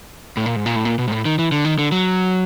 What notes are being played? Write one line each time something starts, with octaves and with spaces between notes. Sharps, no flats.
A2
A#2
G#2
A#2
A2
A#2
B2
G#2
A2
D#3
E3
D3
D#3
D3
F#3